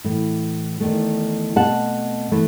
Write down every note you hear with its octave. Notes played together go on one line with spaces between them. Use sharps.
A2 E3 A3
E2 D#3 A3
B2 A3 C4 F#5 A5
E3 A3